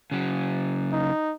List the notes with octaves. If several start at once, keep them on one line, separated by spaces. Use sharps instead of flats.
C#3 F#3
D#4